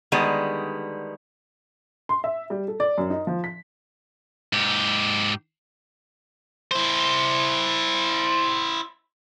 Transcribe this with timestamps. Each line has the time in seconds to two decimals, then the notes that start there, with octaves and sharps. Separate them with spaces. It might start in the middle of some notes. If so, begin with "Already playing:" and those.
0.12 D3 D#3 G3 G#3 B3
2.09 C6
2.24 E5
2.50 G3
2.68 A4
2.80 D5
2.98 F#2
3.10 D#4
3.27 F3
3.44 B6
4.53 G#2 G4
6.71 E4 C5